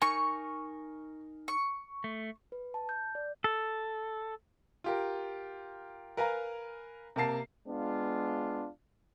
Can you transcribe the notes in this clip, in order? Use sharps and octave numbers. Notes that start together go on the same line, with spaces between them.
D#4 A#4 G#5 C#6
C#6
A3
B4
A5
G6
D5
A4
F4 G4 A#4
A#4 B4 F5 G#5 A#5
C3 A#3 A#4 A5 C7
G#3 B3 D4 F4